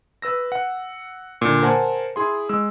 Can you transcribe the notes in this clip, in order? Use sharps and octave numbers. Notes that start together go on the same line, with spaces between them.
B4 E6 A#6
F#5
A#2 D3
A#4 C5 F#5 G#5 A5
E4 G#4 C6
G#3 E6